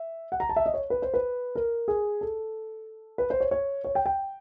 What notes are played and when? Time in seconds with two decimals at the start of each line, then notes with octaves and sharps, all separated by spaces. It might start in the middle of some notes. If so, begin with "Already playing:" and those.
Already playing: E5
0.32 F#5
0.40 A#5
0.49 A5
0.56 E5
0.66 D#5
0.74 C#5
0.90 B4
1.02 C5
1.14 B4
1.55 A#4
1.88 G#4
2.21 A4
3.18 B4
3.30 C5
3.40 C#5
3.51 C#5
3.84 C#5
3.95 G5
4.06 G5